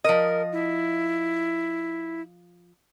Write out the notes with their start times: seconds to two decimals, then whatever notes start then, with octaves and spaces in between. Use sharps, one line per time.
0.04 F3 A#4 D#5
0.52 E4